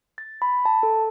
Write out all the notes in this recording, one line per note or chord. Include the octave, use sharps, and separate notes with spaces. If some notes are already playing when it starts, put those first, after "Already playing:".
A6
B5
A5
A4